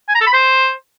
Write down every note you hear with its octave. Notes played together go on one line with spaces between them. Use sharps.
G#5
A#5
A4
B5
C5